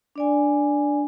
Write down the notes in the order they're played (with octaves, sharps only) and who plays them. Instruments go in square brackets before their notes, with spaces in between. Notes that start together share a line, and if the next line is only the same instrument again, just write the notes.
[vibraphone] D4 D5 G#5